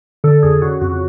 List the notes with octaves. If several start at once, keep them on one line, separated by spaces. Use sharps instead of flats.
D3 A4
F2 G#4
C#3 F#4
F2 F#4